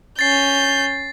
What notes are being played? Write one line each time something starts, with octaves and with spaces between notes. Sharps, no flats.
C#4 G6 A6 C7